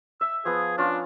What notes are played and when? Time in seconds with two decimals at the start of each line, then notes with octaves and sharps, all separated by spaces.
0.21 E5 E6
0.45 F3 B3 G#4
0.78 C#4 D4 F4